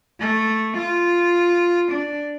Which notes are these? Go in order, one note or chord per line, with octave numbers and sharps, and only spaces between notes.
A3
F4
D4